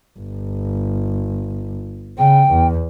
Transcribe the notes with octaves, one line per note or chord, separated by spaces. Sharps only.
G1
C#3 G5
E2